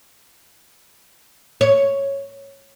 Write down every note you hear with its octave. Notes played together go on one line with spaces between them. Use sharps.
C#5